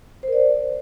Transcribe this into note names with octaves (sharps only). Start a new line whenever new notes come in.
A#4 C5 D5